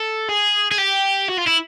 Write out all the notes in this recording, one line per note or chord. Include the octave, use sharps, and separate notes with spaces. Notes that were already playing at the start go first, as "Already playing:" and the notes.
Already playing: A4
G#4
G#4
G4
F#4
F4
E4